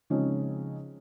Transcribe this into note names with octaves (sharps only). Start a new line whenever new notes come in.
C#3 F3 G#3 C4 C#4 D#4